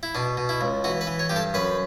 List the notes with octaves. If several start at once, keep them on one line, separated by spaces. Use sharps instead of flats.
E4
B2 D4
B2
E4
C#2
E3 F#4
B4
E3
C#5
G2 G4
A4
F#2 B4